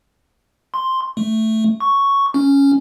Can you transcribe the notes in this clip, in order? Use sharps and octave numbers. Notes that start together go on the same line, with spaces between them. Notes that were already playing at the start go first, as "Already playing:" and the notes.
C6
A3
C#6
C#4